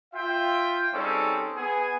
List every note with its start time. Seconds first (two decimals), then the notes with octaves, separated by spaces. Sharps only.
0.14 F4 E5 G5
0.93 G3 C4 C#4 D#4 G#4 A4
1.55 B3 G#4 G#5